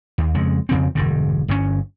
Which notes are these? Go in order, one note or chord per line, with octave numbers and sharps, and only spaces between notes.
D#2
F2 C#3 G#3
F2 C#3 C4
E1 G2 D3
G1 G2 A#2 C#4